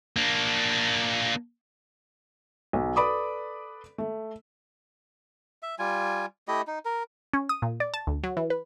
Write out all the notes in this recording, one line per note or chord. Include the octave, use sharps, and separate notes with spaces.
A#3 D4
B1
A4 B4 D5 B5 D6 D#6
A3
E5
G3 F4 G#5
A3 E4 G4 D#5
D#4
A#4
C#4
D#6
A#2
D5
A5
D2
F#3
E3
B4